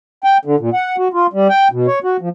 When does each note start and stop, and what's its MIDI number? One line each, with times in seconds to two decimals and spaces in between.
0.24 0.38 79
0.45 0.56 50
0.60 0.70 46
0.73 0.96 78
0.98 1.08 66
1.13 1.27 65
1.33 1.48 55
1.49 1.68 79
1.72 1.87 47
1.87 1.99 73
2.04 2.17 66
2.21 2.29 53